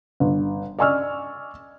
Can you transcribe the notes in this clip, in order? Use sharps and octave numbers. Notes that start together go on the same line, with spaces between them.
G1
D5 D#5 G#5 C#6 E6 F6